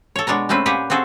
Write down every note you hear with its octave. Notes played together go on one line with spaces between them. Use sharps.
A4 C#5
B2 G#3 D4 C#5 A#5
G#3 A3 C4 C#4 B4
A#2 G4 G#4 B4 F#5 G5
C4 F#4 G#4 A4